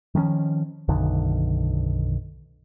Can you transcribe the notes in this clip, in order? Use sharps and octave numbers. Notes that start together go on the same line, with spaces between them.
D#3 F3 G#3 C#4
B1 F#2 D3 D#3